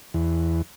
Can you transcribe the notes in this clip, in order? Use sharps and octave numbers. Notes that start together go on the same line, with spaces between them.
E2